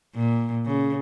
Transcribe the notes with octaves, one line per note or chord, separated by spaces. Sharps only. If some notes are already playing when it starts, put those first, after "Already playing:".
A#2
C#3